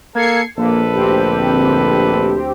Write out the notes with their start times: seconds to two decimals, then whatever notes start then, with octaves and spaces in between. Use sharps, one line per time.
0.16 A#3 A4 G#6 C7 C#7
0.58 A#1 A#3 A4 B4
0.95 D2 C4 G4